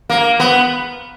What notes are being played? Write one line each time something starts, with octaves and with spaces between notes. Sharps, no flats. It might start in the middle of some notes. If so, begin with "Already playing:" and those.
A#3
B3